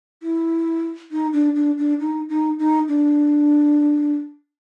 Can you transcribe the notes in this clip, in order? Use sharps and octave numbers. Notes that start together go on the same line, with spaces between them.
E4
D#4
D4
D4
D4
D#4
D#4
D#4
D4